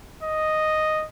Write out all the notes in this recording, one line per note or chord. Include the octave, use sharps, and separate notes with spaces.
D#5